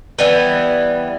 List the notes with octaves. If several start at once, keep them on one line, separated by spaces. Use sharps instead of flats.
E3 G3 B3